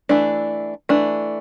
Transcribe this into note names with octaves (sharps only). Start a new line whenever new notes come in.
E3 A3 D4
E3 A3 D4